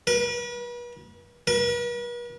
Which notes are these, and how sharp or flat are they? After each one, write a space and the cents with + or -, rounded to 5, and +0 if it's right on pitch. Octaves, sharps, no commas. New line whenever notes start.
B4 -40
B4 -45